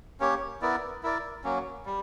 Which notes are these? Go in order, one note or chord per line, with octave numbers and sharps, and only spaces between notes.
A#3 C#4 G4 C#5
B3 E4 A#4 D5
E4 A#4 D5
F#3 A#3 C#4
G3